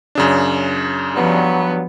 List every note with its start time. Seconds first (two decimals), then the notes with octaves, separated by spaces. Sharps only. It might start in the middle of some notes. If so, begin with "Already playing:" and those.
0.15 F#2 C#3 D4
1.15 G2 F3 F#3 B3